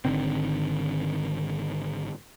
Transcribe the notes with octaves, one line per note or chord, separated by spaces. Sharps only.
G#1 D3 D#3 C4